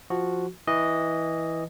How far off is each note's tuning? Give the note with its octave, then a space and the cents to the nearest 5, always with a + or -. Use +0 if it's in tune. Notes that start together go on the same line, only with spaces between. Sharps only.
F3 +0 F#4 +0
E3 -10 D#5 +0